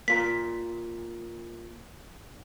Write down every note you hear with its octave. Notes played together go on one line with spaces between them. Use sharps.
A#3 F4 A#4 B6